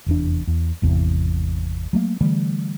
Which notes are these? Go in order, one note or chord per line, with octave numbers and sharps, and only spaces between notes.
F1 E2 D4
E2
G#1 E2 C3
F#3 A3 A#3
D3 E3 G3 A3